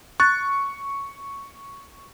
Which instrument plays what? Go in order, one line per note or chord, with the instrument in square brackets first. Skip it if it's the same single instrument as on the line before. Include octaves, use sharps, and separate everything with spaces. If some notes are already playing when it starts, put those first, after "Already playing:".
[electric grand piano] C#6 [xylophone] F#6 A6